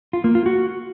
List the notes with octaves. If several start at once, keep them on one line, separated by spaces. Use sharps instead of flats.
F4
A#3
F4
F#4